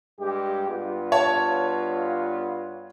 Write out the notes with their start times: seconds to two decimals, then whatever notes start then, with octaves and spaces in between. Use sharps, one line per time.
0.20 G2 G#3 G4
0.69 G2 B3 F4
1.12 C#5 A5